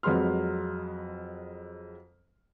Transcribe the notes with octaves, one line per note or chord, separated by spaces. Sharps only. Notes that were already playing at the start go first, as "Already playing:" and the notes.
F2 F#3 G#3 B4 C6 F6